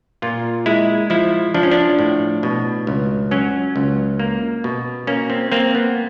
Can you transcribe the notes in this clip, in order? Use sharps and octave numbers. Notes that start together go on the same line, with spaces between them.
A#2 F4
G#3 E4
F3 E4
F3 D4
C#4
D4
A2
B2
C#2
F#3 C#4
C#2
A#3
B2
A#3 C#4
C4
A#3 C4
B3